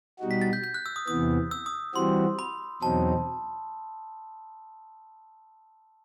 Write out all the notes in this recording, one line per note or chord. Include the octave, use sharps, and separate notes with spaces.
B2 G3 D#4 F#4
B6
A6
G6
G6
F#6
E6
D#6
E2 C3 E3 B3 D#6
E6
D#6
E3 G3 C4 F#4 C6
B5
E2 B2 F#3 C4 D#4 A5